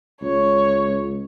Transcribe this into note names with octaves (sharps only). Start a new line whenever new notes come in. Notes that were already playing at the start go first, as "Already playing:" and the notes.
C#2 C#5